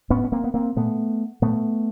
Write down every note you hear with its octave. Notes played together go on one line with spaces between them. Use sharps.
A2 B3 C#4
C#4
A#3 C4
B3
A#3 C4
A#2 A3 B3
A#2 A3 B3